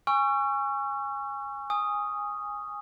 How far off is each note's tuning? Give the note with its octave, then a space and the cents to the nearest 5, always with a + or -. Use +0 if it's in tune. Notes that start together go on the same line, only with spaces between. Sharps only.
G#5 -20 C#6 +0 E6 +45
G#5 -10 D#6 +0